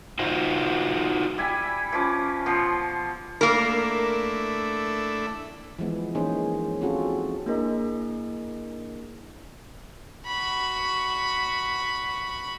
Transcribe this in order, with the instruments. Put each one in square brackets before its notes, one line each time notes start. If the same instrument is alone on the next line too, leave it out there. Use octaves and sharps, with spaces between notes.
[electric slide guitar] D#4 F4 F#4 C5
[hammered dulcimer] G3 E4 G#5 B5
E3 F3 C#4 D6
B2 F3 C6
[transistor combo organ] A3 D4 E4 [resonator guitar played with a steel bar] A#3 A#4
[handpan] E3 F3 G#3 B3
E3 A#3 C#4 D#4 G#4 C5
C4 C#4 F4 F#4 G#4 A4
[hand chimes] A#3 D4 E4 G#4 A#4 D#5
[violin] F#4 B5